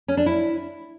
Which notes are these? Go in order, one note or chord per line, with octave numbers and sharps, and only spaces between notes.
C#4
D4
E4